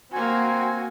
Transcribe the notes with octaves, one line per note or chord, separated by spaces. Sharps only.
A#3 C4 F#4 G#5